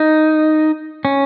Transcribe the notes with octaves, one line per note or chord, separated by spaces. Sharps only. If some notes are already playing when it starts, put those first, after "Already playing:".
Already playing: D#4
C#4